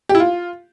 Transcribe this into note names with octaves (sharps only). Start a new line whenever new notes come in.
G4
E4
F4